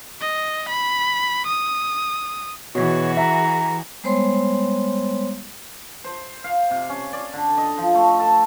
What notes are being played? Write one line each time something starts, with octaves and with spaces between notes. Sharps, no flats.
D#5
B5
D#6
B2 E3 F#4 G#4 C#5
E5 A#5
G3 G#3 B3 C5 C#5 C6
C5
F5
C3
C#4
D5
D3
D#5
F3
A3
A4